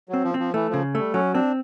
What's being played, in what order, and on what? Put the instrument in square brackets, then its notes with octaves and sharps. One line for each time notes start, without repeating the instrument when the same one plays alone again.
[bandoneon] F#3 [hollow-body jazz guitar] C4
[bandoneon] F3
[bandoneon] F3 [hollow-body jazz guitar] C4
[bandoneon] E3 [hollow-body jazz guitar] A3
[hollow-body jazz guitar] C#3 [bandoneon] F3
[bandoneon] G3 [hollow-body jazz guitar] A3
[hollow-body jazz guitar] F#3 [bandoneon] C#4
[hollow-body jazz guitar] C4 [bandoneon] D4